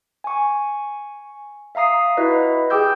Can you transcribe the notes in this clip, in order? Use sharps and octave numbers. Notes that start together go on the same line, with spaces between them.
G#5 C#6
E5 F5 A#5 D#6 C7
E4 F#4 B4 D#5 E5
G4 G#4 G5 D6 E6 G6